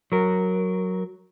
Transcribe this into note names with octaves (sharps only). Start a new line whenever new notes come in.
F#3 A#4